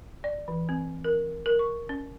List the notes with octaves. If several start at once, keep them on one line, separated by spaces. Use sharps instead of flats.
D5
E3
C4
A#4
A#4
C#6
C#4